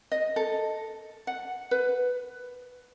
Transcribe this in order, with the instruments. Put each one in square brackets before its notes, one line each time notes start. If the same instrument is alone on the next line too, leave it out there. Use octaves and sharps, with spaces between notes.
[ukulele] D#5
A4
F#5
B4